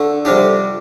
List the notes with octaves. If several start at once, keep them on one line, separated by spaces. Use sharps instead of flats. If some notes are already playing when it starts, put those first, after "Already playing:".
Already playing: D3 A3
F2 C3 G3 D4 G4